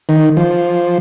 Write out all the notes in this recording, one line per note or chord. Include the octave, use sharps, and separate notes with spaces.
D#3
F3